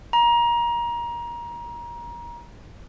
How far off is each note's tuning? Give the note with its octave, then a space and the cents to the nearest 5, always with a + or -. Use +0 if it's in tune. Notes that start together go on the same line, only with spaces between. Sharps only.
A#5 +25